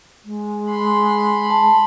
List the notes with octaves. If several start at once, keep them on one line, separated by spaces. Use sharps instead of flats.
G#3
B5 C6
A5